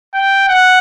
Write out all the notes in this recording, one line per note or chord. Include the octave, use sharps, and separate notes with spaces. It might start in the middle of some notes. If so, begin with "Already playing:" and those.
G5
F#5